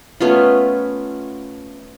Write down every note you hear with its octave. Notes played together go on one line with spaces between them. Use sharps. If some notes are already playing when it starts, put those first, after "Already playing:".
A3 B3 C#4 F4